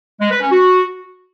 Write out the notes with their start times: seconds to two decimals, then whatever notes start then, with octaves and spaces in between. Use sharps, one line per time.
0.21 G#3
0.31 B4
0.41 C#4
0.51 F#4